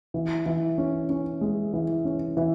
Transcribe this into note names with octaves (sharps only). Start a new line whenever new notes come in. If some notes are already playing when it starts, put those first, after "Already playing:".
E3
E3
C#4
C#4
G#3
E3
C#4
E3